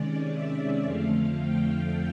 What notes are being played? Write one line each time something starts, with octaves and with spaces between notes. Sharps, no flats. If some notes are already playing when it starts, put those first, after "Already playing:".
Already playing: C3 D#3 G#3 C#4 D5
E5
F2 D3 F3 A3 F5
G5